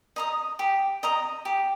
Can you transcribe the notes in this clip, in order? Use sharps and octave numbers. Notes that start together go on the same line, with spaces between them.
D#5 A#5 D#6
G4
D#5 A#5 D#6
G4